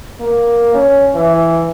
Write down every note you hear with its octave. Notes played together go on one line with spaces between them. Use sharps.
A#3
C#4
E3